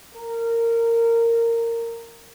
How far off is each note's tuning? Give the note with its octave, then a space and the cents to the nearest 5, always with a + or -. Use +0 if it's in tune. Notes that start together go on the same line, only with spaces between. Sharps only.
A#4 -15